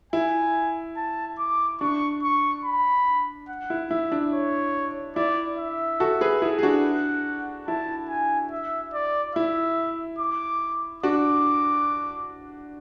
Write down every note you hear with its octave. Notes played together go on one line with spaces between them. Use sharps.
E4 G#5
A5
D6
D4 C#6
C#6
B5
F#5
E4
E4 E5
D4
C#5
E4 D5
E5
F#4 A4
G#4 B4
E4 G#4
G#4
D4 F#4
F#5
E4 A5
G#5
E5
D5
E4 E5
D6
D4 F#4 D6